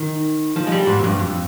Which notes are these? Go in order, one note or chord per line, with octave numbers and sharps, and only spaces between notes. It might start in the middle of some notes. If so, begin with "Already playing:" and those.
Already playing: D#3
F3
G#3
G3
G#2
F2
G2
F2